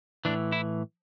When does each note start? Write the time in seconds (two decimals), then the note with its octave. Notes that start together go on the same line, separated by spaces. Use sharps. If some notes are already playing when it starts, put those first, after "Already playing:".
0.25 A2 E3 D4
0.52 E4